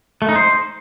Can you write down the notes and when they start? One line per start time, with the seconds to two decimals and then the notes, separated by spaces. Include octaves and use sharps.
0.22 A3
0.29 D#4
0.36 C5